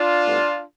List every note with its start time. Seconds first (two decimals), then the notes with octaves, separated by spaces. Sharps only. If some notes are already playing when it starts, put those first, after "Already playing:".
Already playing: D4 F4
0.24 A2 G3 B3